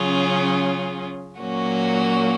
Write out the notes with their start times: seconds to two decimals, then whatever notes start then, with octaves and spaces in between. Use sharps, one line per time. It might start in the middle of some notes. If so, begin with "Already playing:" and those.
Already playing: C#3 F#3 C#4 F4 G#4
1.39 A#2 F#3 A#3 C#4 F#4